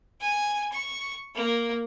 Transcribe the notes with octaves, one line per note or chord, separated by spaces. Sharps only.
G#5
C#6
A#3